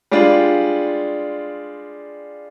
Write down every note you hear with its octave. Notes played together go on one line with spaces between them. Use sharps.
G3 G#3 D4 F4